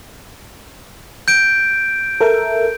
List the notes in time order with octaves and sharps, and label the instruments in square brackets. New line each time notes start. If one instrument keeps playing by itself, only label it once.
[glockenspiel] G6 D7
[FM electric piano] A4 A#4 E5